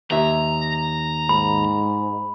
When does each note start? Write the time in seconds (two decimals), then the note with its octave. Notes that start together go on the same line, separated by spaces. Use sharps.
0.11 D#2 E5 A#5
1.29 G#2 B5